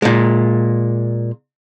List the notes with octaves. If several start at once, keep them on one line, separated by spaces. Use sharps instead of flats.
A#2 G#3